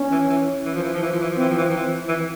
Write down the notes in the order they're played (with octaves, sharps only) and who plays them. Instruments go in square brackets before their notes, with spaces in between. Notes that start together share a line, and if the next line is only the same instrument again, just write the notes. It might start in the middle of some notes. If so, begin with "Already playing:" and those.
Already playing: [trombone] C#4
[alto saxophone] E3
E3
E3
F3
E3
F3
E3
F3
E3
F3
[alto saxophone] E3 [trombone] C4
[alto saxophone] F3
E3
F3
E3
E3